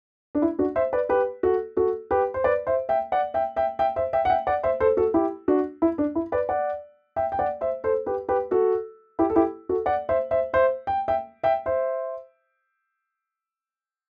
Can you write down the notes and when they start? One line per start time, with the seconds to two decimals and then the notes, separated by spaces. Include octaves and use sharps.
0.35 D4
0.42 E4
0.59 D4 F#4
0.76 C5 E5
0.93 B4 D5
1.09 G4 B4
1.43 F#4 A4
1.77 F#4 A4
2.11 G4 B4
2.34 C5
2.44 B4 D5
2.67 C5 E5
2.89 E5 G5
3.12 D5 F#5
3.34 E5 G5
3.56 E5 G5
3.79 E5 G5
3.96 C5 E5
4.13 E5 G5
4.25 F#5
4.30 E5 G5
4.47 D5 F#5
4.63 C5 E5
4.80 A4 C5
4.97 F#4 A4
5.14 E4 G4
5.48 D4 F#4
5.82 E4
5.98 D4
6.15 E4
6.32 B4 D5
6.49 D5 F#5
7.16 E5 G5
7.32 G5
7.39 D5 F#5
7.61 C5 E5
7.84 A4 C5
8.06 G4 B4
8.29 G4 B4
8.51 F#4 A4
9.19 E4 G4
9.30 A4
9.36 E4 G4
9.69 F#4 A4
9.86 D5 F#5
10.09 C5 E5
10.31 C5 E5
10.53 C5 E5
10.87 G5
11.08 E5 G5
11.44 E5 G5
11.66 C5 E5